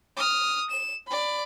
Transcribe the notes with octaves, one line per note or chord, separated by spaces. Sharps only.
D#6 F6
E7
D5 B5